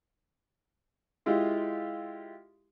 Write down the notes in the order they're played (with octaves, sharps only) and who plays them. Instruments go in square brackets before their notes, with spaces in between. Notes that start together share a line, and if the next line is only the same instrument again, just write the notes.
[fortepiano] G#3 E4 F4 G4